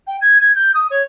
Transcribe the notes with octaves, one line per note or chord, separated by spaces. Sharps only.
G5
G#6
G#6
G6
D#6
C#5